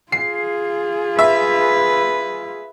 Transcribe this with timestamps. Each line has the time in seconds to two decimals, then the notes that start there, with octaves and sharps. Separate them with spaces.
0.12 F4 G#4 C7
1.19 B4 E5